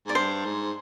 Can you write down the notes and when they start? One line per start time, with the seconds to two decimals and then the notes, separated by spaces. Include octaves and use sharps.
0.06 G#2 D5
0.15 G2 C5
0.45 G#2